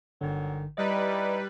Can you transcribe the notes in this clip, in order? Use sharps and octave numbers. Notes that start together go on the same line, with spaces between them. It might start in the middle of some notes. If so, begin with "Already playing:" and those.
G1 G#2 D3 D#3 F#3
G3 D#4 E4 B4 D5 D#5